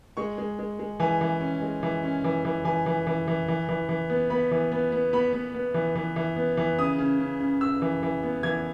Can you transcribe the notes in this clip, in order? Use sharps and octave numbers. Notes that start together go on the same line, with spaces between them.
G#3 C#6
G#3
G#3
G#3
E3 G#5
E3
C#4
G#3
E3
C#4
E3
E3
E3 G#5
E3
E3
E3
E3
E3
E3
B3
B3 B5
E3
B3
B3
B3 B5
B3
B3
E3
E3
E3
B3
E3
C#3 D#6
C#3
C#3
C#3
C#3 E6
E3
E3
B3
E3 G#6